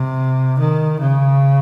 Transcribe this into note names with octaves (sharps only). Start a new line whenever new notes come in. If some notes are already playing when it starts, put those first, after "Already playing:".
Already playing: C3
D#3
C#3